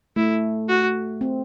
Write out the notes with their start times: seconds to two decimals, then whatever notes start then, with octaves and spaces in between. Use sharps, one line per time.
0.16 A3 E4
0.69 F#4
1.21 C4